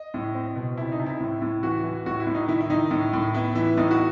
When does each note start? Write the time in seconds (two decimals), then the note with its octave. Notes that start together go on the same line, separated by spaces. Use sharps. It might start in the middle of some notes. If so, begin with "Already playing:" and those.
Already playing: D#5
0.14 A2
0.35 C4
0.56 B2
0.77 C3 E4
0.92 D#4
0.99 C3
1.06 E4
1.20 A2
1.42 A2
1.63 E3 F#4
1.84 E3
2.06 A2 F#4
2.20 E4
2.27 A2
2.35 D#4
2.48 D#3 E4
2.61 E4
2.70 D#3 D#4
2.91 A2
3.13 A2
3.35 B3 E4
3.55 E3 E4
3.77 A2 D#4
3.91 F#4